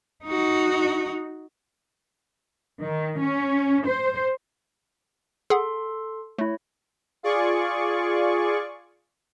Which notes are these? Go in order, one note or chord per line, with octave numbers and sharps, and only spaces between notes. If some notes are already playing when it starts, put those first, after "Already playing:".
D#4 F#4
D#3
C#4
C5
G#4 A4 F#5 C6
A3 E4 C#5
F4 G#4 D5 C#6